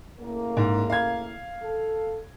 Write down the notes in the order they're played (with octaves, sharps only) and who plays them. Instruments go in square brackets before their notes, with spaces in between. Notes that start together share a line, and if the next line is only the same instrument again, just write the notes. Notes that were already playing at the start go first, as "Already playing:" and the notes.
[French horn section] A2 C#3 A#3
[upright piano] G#2
F5 G#6
[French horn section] A4